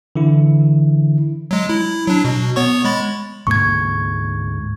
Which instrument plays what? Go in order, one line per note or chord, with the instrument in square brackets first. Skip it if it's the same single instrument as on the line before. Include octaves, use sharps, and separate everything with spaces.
[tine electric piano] D3 E3 E4
[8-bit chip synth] F#3 G#3
E4
F#3 D4
B2
B3 C#5 C#6
G#3 B5 A6
[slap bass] D2 G#2 A#3 [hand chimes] C#6 G#6